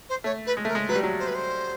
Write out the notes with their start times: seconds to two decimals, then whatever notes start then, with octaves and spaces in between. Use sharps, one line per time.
0.09 C5
0.24 A3 C#5
0.46 B4
0.57 G#3
0.65 A3 A#4
0.75 G#3
0.88 F#3 B4
0.96 G3
1.03 F#3
1.19 C5
1.27 B4
1.34 C5